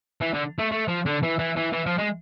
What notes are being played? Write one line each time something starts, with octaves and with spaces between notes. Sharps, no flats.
E3
D3
A3
A3
F3
D3
E3
E3
E3
E3
F3
G#3